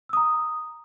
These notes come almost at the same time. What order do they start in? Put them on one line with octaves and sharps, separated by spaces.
E6 D#6 A#5